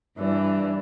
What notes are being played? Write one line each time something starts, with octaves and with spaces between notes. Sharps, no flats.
G2 E3 D4